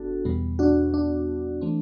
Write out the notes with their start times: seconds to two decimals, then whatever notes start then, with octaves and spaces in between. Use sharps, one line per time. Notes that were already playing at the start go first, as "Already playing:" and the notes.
Already playing: G1 B3 D4 F#4 A4
0.25 E2 B2 G3 B3
0.59 D4 F#4
0.94 D4
1.61 E3 A3 C4